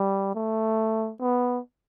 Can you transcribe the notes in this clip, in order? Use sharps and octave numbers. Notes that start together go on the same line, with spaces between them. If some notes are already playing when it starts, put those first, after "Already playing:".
Already playing: G3
A3
B3